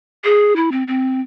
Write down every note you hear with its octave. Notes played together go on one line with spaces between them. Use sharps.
G#4
E4
C4
C4